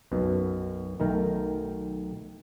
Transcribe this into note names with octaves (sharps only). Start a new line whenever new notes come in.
B1 F#2 B2
B1 D#3 A3 A#4 G5